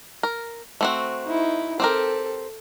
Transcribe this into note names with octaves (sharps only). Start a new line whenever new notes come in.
A#4
A3 C4 F#4
D#4 E4
C4 G4 A4 A#4